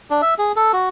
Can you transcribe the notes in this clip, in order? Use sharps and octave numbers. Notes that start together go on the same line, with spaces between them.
D4
E5
G#4
A4
F#4